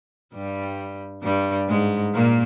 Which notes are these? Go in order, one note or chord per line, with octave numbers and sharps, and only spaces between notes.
G2 G3
G2 G3
G#2 G#3
A#2 A#3